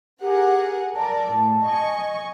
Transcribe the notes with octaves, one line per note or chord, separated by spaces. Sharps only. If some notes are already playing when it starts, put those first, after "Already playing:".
G4 G#4 A#4 F#5
A#4 D5 A5
A2
D#5 G#5 C#6